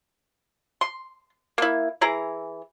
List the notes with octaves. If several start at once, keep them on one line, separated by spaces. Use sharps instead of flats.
C6
A#3 E4
E3 E4 G#4 A#5